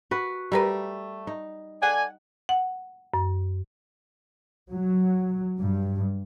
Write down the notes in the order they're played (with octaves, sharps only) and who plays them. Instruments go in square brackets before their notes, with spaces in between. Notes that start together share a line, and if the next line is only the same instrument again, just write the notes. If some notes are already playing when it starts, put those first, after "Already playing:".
[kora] F#4 B4
[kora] G3 [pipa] A3 A#4 B4
[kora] D#4
[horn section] A4 D5 G#5 [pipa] F#5
[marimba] F#5
F#2
[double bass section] F#3
G2